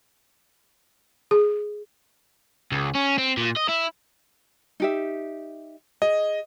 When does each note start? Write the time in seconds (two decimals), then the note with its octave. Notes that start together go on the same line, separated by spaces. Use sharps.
1.31 G#4
2.72 C#2
2.95 C#4
3.18 C4
3.37 A#2
3.56 D#5
3.68 E4
4.80 D#4 G4 E5
6.02 G#4 D#5